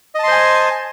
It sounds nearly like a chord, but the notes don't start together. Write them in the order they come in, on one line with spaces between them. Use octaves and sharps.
D#5 A5 C6 C5 G#5